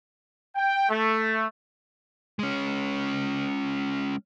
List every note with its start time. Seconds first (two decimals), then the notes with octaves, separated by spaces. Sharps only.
0.56 G5
0.89 A3
2.39 G#3 C#4